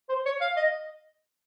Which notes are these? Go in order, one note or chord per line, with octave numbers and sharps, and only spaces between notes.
C5
C#5
F5
D#5